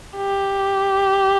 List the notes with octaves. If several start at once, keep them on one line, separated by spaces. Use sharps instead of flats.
G4